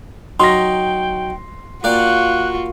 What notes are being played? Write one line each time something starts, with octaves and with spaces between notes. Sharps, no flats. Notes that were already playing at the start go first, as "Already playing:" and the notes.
F#3 D#4 G5 C6 A#6
A#3 F4 F#4 D5 G5 F#6